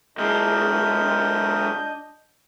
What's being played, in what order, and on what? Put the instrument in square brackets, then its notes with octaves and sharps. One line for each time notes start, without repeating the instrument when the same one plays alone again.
[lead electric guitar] B1 G#3 [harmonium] D4 D#5 [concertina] A#4 E5 [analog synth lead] G6